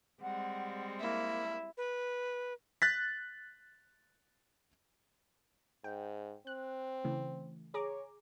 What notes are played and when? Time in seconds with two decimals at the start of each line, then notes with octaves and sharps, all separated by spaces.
0.22 G3 G#3 C4 F#5
1.00 A#3 E4
1.77 B4
2.82 F#6 A6 B6
5.84 G#2 G5
6.47 C4 F#6
7.04 C#3 E3 A3
7.74 G#4 C#5 A#5 D6